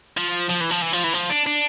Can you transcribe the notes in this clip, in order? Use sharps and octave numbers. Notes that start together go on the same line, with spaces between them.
F3
F3
E3
F3
E3
F3
E3
F3
D4
D4